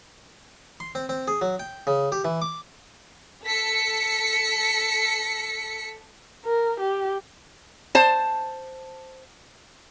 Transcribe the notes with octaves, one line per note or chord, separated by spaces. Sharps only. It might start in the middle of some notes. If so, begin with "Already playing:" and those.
C6
C4
C4
G#4
F#3
G5
C#3
G4
E3
D6
A4 B6 C#7
A#4
G4
C5 A5